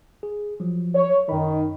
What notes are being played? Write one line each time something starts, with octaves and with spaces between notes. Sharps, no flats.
G#4
F3 F#3
C#5
F#2 D#3 B5